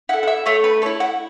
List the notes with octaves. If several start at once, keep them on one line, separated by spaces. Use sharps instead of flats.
E4 A4 F#5
F#5
E5
A3 C#5
B4
A4 C#5
E4
F#5